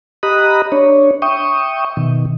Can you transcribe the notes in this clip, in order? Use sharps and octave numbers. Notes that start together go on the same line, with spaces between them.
G4 D#5 A#5 B5 D#6 F#6
D4 C#5
E5 G5 C#6 D#6
B2 D#3